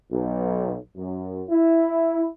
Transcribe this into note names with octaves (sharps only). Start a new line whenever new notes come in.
B1
F#2
E4